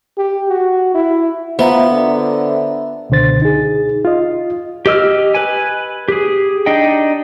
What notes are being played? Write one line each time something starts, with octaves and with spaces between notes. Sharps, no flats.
G4
F#4
E4
B3 F4 C5 E5 A#5
D3
C#2 B2 D3 C5 A6
D#4 G#4
F4 D#5
G4 D#5 E6 F6
B4 G#5
G4 G#4
D4 D#4 D#5 G5